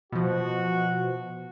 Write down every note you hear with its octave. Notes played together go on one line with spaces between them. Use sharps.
B2 F3 F#4